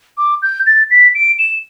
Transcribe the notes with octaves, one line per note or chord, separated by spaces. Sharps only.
D6
G6
A6
B6
D7
E7